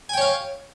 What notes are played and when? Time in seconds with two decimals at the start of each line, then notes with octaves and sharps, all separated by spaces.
0.09 G#5
0.13 G5
0.17 C#5
0.21 F5